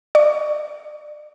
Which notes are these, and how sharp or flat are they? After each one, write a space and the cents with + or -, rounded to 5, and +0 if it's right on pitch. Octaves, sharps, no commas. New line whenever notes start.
D5 +30 C#6 +25